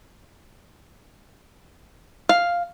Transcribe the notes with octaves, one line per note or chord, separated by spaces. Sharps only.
F5